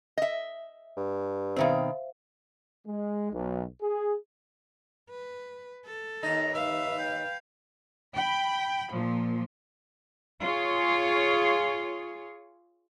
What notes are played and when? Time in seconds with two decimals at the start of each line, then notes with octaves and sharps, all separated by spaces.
0.17 D#5 E5
0.97 G2
1.56 B2 D#3 C4 C5 E5 F5
2.86 G#3
3.32 B1
3.82 G#4
5.09 B4
5.86 A4
6.23 D#2 D#4 A#5
6.54 B4 E5 F5
6.99 G5
8.16 G5 B5
8.91 A#2 F3
10.40 F4 G#4 C#5